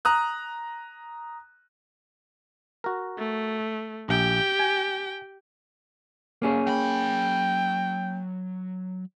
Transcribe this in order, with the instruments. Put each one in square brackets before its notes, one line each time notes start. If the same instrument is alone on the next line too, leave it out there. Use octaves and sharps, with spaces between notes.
[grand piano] A#5 D#6 F#6
[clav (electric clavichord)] F#4 A#4
[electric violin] A3
[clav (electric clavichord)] A#1 [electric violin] G4 G5
[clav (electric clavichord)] G#5
[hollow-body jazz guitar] A#3 C#4 G#4
[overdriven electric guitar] F#3 B5 [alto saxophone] G5